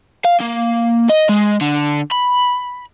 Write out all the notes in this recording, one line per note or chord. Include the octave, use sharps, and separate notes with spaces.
F5
A#3
D#5
G#3
D3
B5